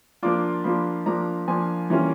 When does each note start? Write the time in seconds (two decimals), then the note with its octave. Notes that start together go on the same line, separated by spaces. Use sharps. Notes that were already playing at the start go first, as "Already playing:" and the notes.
0.23 F3 A#3 D4 F4 D6
0.64 F3 A#3 D4 F4 B5
1.06 F3 A#3 D4 F4 A#5
1.48 F3 A#3 D4 F4 G#5
1.90 E3 G3 A#3 C#4 F4